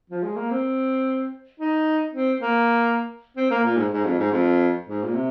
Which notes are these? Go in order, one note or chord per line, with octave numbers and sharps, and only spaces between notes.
F3
G#3
A#3
C4
D#4
C4
A#3
C4
A#3
A#2
G#2
G#2
F2
G#2
F2
G#2
A#2
C3